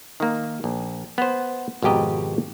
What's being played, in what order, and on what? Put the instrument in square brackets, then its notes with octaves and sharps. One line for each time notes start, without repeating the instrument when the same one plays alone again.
[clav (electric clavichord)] D#3 A#3
A#1
B3 C5
G#1 F2 B2 G4 D#5 A#5